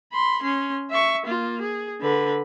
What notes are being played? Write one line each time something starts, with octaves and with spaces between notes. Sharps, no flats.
B5 C6
C#4 C6
E5 C#6
A#3 F4
G#4
D3 B4